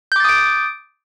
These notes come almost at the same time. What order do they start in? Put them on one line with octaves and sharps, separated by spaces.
G6 D6 A6 D#6 D7